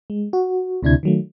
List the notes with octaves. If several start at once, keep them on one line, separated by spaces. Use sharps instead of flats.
G#3
F#4
D2 C3 D4 E4 G#6
D#3 F#3 A3